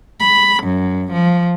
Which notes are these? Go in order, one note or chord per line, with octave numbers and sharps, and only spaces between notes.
B5
F#2
F3